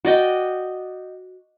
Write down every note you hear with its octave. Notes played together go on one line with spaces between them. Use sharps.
F#4 D5 D#5 G5